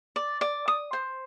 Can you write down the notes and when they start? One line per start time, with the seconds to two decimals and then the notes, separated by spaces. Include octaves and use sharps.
0.16 D5
0.41 D5
0.68 D#6
0.93 C5